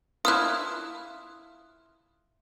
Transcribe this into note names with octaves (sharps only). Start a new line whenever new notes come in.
E4 F4 D#6 F6 F#6